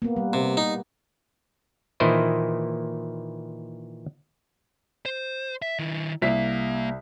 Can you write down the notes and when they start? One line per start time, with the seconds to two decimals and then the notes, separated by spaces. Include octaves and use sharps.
0.02 A#3 B3
0.16 G3
0.33 C3
0.57 D#4
2.00 A#2 D#3 E3 E4 C5 D#5
5.05 C5
5.62 E5
5.79 D#3 E4
6.22 C2 A#3 E5 B6